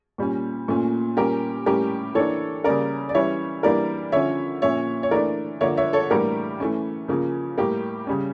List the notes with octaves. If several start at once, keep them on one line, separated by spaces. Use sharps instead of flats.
A#2 G3 C#4
A#2 A3 C#4
A#2 G3 C#4 G4 A#4
A2 G3 C#4 G4 A#4
E3 A#3 D4 A4 C#5
C#3 G3 A#3 C#4 A#4 D5
D5
E3 G3 C#4 C#5 E5
E3 G3 A#3 D4 A#4 D5
D3 F3 C#4 C#5 E5
A#2 F3 C#4 C#5 E5
C#5
E3 A3 D4 A#4 D5
D3 F3 A#3 D4 C#5 E5
C#5 E5
A4 C#5
A2 E3 G3 A#3 D4 G4 A#4
E3 A3 C#4
C#3 F3 A#3 C#4
A2 G3 A#3 G4
C#3 G3 C#4